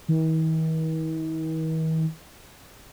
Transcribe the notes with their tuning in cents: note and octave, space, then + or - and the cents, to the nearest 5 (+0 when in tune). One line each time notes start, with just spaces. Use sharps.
D#3 +45